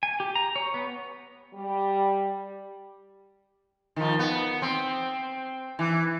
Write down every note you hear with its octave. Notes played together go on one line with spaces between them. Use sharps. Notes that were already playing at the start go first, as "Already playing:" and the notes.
G#5
G4
A#5
C#5
B3
G3
D#3 F3
B3
C4
E3